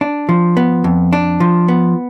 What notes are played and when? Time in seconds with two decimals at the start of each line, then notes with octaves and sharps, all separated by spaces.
0.01 D4
0.29 F3
0.57 B3
0.84 F2
1.13 D4
1.40 F3
1.68 B3